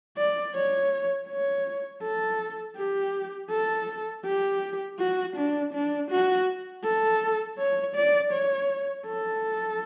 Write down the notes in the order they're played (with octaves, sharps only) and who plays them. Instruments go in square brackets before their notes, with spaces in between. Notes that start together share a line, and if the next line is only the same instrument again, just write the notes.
[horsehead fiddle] D5
C#5
C#5
A4
G4
A4
G4
F#4
D4
D4
F#4
A4
C#5
D5
C#5
A4